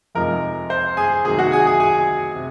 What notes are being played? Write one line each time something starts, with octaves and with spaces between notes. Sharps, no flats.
F2 C3 F3 G#3 D#4 A#4
C5
G#4 G#5
C3 D#3 F#3 A#3 G#4 G#5
F#4 F#5
G#4 G#5
G#4 G#5
G#4 G#5
C3